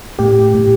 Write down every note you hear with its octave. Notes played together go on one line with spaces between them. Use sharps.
A2 G4
A2